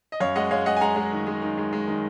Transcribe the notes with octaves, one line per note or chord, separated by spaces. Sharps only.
D#5
F#2 C#5 F5
G#3 D#5 F#5
G#3 C#5 F5
G#3 D#5 F#5
G#5
G#3 F#5 A#5
G#3
D#3
G#3
D#3
G#3
G#3
D#3